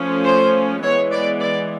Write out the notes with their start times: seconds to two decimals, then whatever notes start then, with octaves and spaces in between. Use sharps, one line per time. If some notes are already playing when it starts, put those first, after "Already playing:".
Already playing: F3 A3 C#4
0.25 C5
0.82 E3 G#3 B3 C#5
1.12 D5
1.40 D5